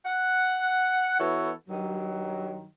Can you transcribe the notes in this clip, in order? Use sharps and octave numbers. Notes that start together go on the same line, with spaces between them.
F#5
E3 B3 F#4 A4 C#5
G2 D#3 F#3